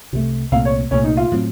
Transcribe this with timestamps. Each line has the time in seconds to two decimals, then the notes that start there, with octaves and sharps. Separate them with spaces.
0.12 C2 C3 D#3 A3
0.52 C2 A#2 A3 C4 F5
0.65 C#5
0.91 C2 A#2 A3 C#4
1.04 D#4
1.17 F4
1.32 A2 F#3 C4